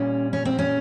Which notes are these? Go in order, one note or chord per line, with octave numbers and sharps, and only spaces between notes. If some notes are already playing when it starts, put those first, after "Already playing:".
Already playing: A#2 G3 C#4
C#4
C4
C#4